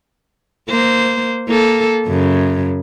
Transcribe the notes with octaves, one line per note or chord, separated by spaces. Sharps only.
A#3 C5
A#3 A4
F#2 C#3